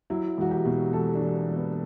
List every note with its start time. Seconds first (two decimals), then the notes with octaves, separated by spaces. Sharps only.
0.10 F#3 E4
0.38 E1 F#4
0.51 G4
0.65 B2
0.93 E1 A4
1.15 D4
1.22 E1
1.49 E1
1.57 B3